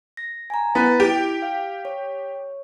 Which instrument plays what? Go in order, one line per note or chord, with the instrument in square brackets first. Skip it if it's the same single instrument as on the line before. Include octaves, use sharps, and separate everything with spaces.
[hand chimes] A#6
G#5 A#5
[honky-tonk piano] B3 [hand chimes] E4 A6 B6
[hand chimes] E4 D7 [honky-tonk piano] G4
[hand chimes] F5
C#5